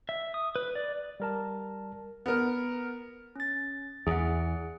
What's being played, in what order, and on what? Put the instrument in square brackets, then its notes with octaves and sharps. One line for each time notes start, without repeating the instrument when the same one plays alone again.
[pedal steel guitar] E5
D#6
B4
D5
[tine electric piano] G3 A#4 A5
[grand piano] B3 A#4
[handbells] C#4 A6
[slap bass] E2 [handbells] G#4 F#5